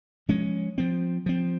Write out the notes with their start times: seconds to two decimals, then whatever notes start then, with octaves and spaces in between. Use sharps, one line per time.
0.29 F3 G#3 C#4
0.78 F3 C4
1.26 F3 C4